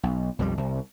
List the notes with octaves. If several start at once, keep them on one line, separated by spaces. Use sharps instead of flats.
B1
B1 F2 D#3 G3
C2